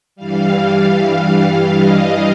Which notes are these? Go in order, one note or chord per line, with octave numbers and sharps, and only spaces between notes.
G2 E3 G3 F5
D#5